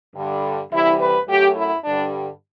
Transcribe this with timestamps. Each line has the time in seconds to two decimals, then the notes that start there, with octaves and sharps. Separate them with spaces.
0.16 G2 D3 G3
0.72 D2 C3 E3 G3 E4
1.00 B4
1.29 F#2 F#3 A3 G4
1.57 E4
1.84 G2 D3 G3 D4